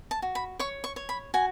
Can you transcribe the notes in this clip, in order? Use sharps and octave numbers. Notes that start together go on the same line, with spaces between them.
A5
F#4
B5
C#5 C#6
C#6
C#5
B5
F#4 G#5